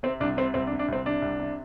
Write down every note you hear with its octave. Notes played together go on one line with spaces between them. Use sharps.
C3 C4
C2 D4
C3 C4
C2 C4
D4
C3
D4
C2 C4
C3 D4
C2
C3